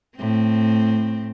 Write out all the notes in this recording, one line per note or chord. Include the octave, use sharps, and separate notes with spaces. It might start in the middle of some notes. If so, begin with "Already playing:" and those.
A2 C4